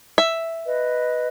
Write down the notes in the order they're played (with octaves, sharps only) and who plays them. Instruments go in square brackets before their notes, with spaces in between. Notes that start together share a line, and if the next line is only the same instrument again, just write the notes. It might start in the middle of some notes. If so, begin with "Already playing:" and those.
[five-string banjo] E5
[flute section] B4 D#5